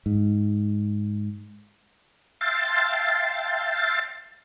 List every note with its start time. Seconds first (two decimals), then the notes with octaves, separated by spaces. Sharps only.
0.06 G#2
2.41 E5 F5 G5 A5 C6 A6